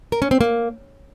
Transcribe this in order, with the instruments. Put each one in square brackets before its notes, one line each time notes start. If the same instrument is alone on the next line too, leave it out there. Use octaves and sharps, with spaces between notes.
[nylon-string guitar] A#4
C#4
C4
A#3